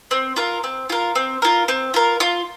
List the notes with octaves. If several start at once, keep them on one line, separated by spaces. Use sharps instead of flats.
C4
F4 A#4
C4
F4 A#4
C4
F4 A#4
C4
F4 A#4
F4